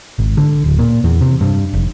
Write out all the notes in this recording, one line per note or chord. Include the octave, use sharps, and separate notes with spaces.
G#1
D3
D1
A#2
E2
C3
G2
F1